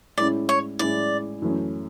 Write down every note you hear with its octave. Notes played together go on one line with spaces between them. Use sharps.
A2 G#3 C#4 E4 D5
C#5
A2 G#3 C#4 E4 D5
F#2 E3 A3 C#4